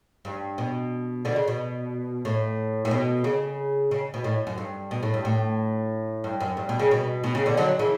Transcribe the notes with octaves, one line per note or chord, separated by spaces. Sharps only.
G2
B2
B2 D3
C#3
B2
A2
A2
B2
C#3
C#3
B2
A2
F#2
G2
B2
A2
G2
A2
G2
F#2
G2
B2
C#3
B2
B2
C#3
B2 D3
D3 F#3
C#3 E3